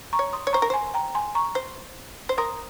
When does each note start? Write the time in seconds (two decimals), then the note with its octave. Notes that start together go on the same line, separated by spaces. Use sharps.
0.13 A#5 C#6
0.19 C#5
0.33 C6 D#6
0.47 C#5
0.53 C5 A#5 C#6
0.62 A#4
0.70 C5 G#5 C6
0.94 G5 A#5
1.15 G#5 C6
1.35 A#5 C#6
1.55 C5
2.29 C5
2.38 A#4 C6 D#6